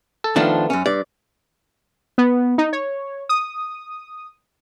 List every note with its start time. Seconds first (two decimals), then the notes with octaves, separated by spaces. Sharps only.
0.24 A4
0.36 D#3 F3 A3 B3 D4
0.70 F#2 C#4
0.86 G2 D5
2.18 B3
2.58 D#4
2.73 C#5
3.29 D#6